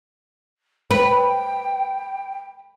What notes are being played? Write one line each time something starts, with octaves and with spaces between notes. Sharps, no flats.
B4 G5